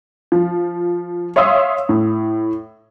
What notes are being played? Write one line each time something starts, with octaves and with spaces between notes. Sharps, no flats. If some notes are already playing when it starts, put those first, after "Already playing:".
F3
C#5 E5 F5 C6 D#6 E6
A2